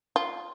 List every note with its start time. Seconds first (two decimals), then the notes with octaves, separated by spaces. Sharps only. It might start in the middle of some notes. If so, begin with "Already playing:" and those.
0.16 F4